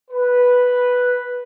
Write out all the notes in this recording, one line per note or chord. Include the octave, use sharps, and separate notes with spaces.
B4